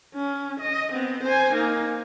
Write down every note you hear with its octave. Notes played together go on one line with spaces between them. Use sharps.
C#4
D#5
B3 C4
C5 G#5
A#3 D#4